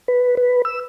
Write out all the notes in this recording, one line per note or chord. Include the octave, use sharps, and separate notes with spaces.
B4
B4
E6